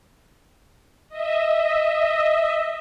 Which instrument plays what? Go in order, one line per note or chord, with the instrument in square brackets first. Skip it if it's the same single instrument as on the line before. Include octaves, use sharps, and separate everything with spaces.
[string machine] D#5 E5